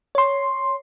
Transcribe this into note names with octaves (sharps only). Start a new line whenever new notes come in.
C#5 C6